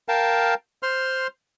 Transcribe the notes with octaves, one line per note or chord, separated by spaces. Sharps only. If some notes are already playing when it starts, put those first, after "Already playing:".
A#4 F5 G5 A5
C5 C6 F6